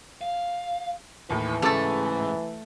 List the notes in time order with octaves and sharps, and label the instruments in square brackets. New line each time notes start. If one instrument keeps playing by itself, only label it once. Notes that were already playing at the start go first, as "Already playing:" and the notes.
[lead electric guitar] F5
[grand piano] D#2 A2 [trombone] E3 [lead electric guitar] B4
[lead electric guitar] G#2 [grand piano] C#3 D6 A6 [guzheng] A3 A4